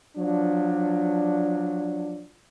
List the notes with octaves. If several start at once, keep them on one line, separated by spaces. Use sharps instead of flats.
F3 F#3 D4